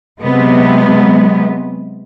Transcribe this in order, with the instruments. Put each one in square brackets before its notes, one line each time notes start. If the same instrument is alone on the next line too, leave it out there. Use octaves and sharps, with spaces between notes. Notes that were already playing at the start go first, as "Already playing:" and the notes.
[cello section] C3 F#3 G#3 B3